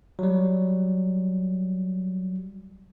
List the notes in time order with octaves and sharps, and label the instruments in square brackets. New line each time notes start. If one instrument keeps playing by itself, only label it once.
[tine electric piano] F#3 G3